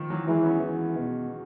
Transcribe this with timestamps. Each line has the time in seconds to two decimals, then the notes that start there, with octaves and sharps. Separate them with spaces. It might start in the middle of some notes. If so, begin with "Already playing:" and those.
Already playing: D#3 F3
0.10 E3 F#3
0.27 E3 F#3 G#3
0.45 B3 C#4
0.63 E3
0.97 B2